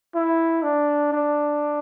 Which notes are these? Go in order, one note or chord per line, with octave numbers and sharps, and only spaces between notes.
E4
D4
D4